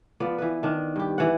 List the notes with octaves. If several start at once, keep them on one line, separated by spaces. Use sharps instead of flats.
F3 B3 D5
E3 B4
D#3 D4
G2 G4
E3 D5 F#5